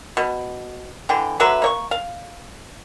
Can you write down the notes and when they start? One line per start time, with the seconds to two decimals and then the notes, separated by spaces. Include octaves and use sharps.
0.17 B2
1.09 D3 E3 G5
1.40 D3 F#3 B4 E5
1.62 A#3 C#5 C#6
1.91 F5